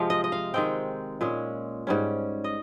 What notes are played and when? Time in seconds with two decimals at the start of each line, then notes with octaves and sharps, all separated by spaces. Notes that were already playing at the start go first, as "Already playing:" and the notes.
Already playing: C3 F3 G#3 F5
0.10 D#5
0.24 D#5
0.32 F5
0.54 D#3 G#3 C4 G5
1.21 A#2 G#3 C#4
1.87 G#2 G3 C#4
2.44 D#5